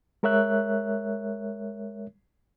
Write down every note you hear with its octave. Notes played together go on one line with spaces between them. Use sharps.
G#3 A#4 C#5 E5 F#6